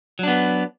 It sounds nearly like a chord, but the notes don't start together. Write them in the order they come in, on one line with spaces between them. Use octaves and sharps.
F#3 D4 B3